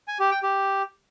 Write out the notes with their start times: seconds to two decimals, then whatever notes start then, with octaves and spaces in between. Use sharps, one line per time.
0.08 G#5
0.19 G4
0.31 G5
0.43 G4